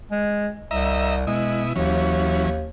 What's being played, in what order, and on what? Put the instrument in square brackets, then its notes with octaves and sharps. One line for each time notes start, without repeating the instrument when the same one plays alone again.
[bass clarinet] G#3
[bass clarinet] C2 [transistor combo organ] D#5 E5 A#5
[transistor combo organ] B2 E4 D#6 [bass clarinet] G#3
[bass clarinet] D#2 [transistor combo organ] E3 F#3 C#4